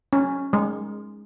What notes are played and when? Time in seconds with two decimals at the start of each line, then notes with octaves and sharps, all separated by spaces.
0.13 C#4
0.53 G#3